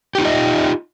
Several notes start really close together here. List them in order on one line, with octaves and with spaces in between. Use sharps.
G4 D#4 F4 D#5